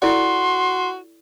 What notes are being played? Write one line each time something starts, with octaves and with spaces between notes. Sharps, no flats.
E4 F#4 A4 D5 C6